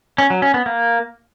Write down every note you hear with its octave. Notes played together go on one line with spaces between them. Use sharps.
C#4
F#3
C#4
B3
A#3